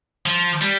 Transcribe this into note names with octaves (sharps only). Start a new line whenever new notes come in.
F3
G3